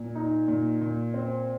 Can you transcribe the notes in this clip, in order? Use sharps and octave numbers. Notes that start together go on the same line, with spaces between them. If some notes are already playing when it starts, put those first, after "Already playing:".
Already playing: A#2
D#4
A#2
A#2
C4